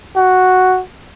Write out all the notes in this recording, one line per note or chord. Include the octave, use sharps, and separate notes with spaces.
F#4